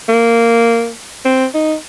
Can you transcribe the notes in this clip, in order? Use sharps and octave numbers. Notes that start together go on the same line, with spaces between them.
A#3
C4
D#4